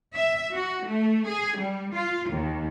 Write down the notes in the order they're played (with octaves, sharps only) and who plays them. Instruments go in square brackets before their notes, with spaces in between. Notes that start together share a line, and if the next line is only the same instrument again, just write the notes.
[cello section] E5
F#4
A3
G#4
G3
F4
D#2